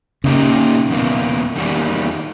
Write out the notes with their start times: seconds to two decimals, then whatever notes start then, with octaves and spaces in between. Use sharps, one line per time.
0.24 A#2 C#3 A#3 D#4 G4
0.90 E2 B2 A#3
1.56 E2 D#3 G3 A#3